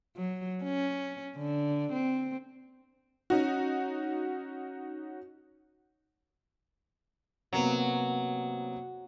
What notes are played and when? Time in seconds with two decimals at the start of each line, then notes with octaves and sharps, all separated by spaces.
0.17 F#3
0.64 C#4
1.37 D3
1.93 C4
3.30 C#4 D#4 F#4
7.53 C3 F#3 A#3 B3